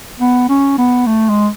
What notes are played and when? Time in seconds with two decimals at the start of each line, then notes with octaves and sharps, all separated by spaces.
0.20 B3
0.49 C#4
0.78 B3
1.07 A3
1.29 G#3